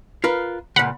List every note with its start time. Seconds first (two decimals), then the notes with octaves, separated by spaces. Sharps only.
0.24 F4 A#4 B4
0.76 C#2 A#2 F#5 B5